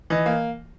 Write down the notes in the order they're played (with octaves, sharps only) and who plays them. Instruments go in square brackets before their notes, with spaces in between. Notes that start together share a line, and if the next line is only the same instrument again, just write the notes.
[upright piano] E3 D#5
A#3